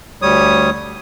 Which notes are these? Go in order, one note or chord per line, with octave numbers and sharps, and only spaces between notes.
D2 G3 C#5 D#6